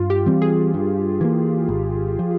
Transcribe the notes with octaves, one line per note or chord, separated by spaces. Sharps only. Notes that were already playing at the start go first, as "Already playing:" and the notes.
Already playing: G2 F4
G4
E3 G3 C4
G#4
G2
E3 A#3
G#1
F3